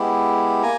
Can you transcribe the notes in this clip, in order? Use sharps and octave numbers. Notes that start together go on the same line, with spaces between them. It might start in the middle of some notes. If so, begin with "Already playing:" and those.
Already playing: G#3 B3 E4 G4
A#3 G#5 A#5